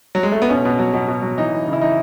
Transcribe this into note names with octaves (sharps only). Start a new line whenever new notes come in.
F#3
G#3
A3
B3
B2 C#4
B2
F#3
B2
B2
F#3
E3 D#4
E3
C#3
E4
E3 D#4